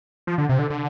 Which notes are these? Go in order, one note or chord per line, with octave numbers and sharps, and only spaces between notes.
F3
D3
C3
D3
D3